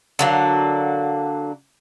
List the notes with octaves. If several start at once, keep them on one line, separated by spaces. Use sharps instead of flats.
D3 F#3 A#3